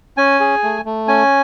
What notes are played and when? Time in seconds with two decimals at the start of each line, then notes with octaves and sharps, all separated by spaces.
0.17 C#4 G#5
0.40 G#4
0.63 A3
0.85 A3
1.08 C#4 G#5